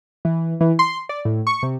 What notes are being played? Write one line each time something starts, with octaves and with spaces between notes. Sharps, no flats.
E3
E3
C6
D5
A2
C#6
C3